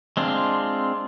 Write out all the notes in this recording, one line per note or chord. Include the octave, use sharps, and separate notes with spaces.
G#3 C4 D4 F4